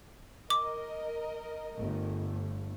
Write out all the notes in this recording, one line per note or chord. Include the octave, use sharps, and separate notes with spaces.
A#4 D#5 D6
G1 A3